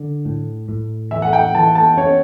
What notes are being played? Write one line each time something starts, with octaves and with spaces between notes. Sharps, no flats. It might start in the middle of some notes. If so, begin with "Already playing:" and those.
Already playing: D3
A2
A2
E3 E5
F#5
G5
E3 A5
A5
C#4 C#5